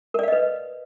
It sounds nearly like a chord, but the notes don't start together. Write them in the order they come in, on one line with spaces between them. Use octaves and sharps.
A#4 D5 F5 D#5 B4